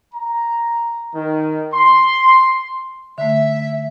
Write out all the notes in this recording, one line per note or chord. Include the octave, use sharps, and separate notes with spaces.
A#5
D#3
C6
D3 A3 E5